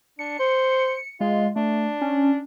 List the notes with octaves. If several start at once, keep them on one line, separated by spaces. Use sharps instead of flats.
D4 C#7
C5
G#3 F4
A3 D4
C#4